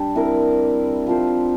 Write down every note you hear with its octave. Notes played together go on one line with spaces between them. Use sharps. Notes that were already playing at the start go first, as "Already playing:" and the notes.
Already playing: G3 D4 G4
C4 E4 A#4
F3 C4 F4 C5